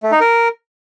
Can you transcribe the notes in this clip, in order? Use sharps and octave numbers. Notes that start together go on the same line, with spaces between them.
A3
D#4
A#4